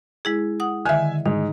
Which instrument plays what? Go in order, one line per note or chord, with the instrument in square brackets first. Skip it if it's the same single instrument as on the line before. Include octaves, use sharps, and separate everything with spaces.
[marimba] G#3 E4 G#4
F#5 D#6
[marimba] D3 D#3 [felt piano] E5 G#5
[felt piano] G#2 [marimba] D#4